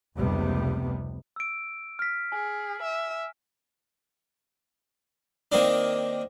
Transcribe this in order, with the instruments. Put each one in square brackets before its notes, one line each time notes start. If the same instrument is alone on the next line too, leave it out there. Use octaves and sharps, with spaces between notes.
[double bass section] F1 C#2 C3 G3 B3
[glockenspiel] E6 D7
F6 B6
[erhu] G#4 [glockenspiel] G#5
[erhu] E5
[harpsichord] D#3 A#3 C4 D4